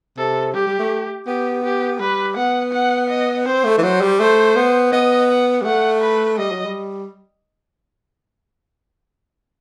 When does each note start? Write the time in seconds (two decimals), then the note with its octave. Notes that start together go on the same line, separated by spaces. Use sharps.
0.17 C3 A4
0.54 G3 G4
0.67 G3
0.79 A3
1.27 B3 G4
1.64 G4
2.00 G3 B4
2.37 B3 F#5
2.73 F#5
3.10 D#5
3.46 C4 C5
3.64 A3
3.78 E3
3.83 F#3 C5
4.01 G3
4.19 A3 C5
4.56 B3
4.92 B3 D#5
5.29 F#5
5.61 G3
5.65 A3 F#5
6.01 B4
6.38 G3 D#5
6.51 F#3
6.65 G3